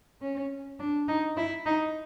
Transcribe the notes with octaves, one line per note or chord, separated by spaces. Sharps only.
C#4
D4
D#4
E4
D#4